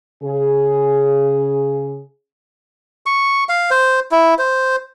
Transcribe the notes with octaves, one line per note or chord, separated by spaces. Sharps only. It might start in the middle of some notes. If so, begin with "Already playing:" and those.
C#3 G#4
C#6
F5
C5
E4
C5